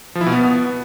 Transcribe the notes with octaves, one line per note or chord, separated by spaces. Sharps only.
F3
E4
B2
B3